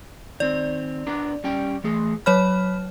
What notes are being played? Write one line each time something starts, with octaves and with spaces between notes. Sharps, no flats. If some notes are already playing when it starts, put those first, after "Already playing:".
D#3 C4 D5
B3 D4 A#4
G3 C#4 G5
E3 A3 G#4
F#3 C#5 B5 F6